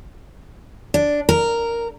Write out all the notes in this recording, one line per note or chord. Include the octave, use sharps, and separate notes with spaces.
D4
A#4